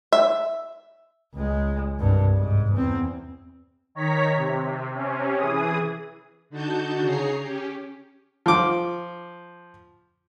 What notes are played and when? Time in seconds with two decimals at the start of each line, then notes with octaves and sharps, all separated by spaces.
0.12 E5
1.35 C#2 G#3
1.99 C2 G2
2.37 G#2
2.72 E2 C4
3.95 D#3 C#5 A#5 B6
4.37 C3
4.94 C3 C#4
5.36 E3 G#4 D#6
6.50 D3 D#4 F#4 A5 G6
7.02 C#3 G#4 C#5 A#5 C7
7.41 C#4 G4
8.46 F3 D6